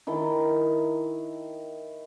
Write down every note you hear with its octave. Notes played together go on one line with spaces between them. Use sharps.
D#3 E4 D#5 A5